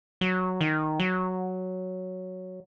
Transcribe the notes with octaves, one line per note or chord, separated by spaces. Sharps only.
F#3
D#3
F#3